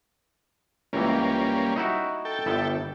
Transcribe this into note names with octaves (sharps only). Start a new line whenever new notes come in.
C#2 E3 G3 A#3 C#4
D#4 E4 F#4
A4 G5
G1 E4